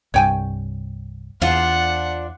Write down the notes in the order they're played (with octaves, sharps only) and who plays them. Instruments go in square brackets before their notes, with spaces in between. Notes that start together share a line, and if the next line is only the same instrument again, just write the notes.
[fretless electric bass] C2 G2 [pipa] C#5 G5 G#5
[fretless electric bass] E2 [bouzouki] D4 F4 C5 [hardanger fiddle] F#5